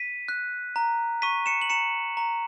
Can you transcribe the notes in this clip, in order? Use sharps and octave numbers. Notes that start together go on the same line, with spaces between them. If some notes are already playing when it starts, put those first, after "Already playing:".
Already playing: B6 D#7
F#6
A#5
C#6 B6 D#7
C#7 E7
F#7
A#5 C#7 E7
A#5